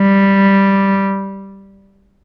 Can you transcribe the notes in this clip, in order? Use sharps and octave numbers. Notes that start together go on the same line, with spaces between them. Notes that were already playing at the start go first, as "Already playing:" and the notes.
Already playing: G3